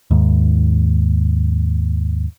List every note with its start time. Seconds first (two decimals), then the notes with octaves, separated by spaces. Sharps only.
0.11 D#2 G#2